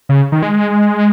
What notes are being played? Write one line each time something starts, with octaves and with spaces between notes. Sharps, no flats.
C#3
D#3
G#3